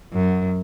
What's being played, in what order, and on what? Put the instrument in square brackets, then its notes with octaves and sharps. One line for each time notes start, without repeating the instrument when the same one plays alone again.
[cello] F#2